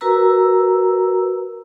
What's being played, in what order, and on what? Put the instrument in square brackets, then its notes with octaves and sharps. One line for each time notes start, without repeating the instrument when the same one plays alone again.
[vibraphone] F#4 A#4 B4 A#5 E6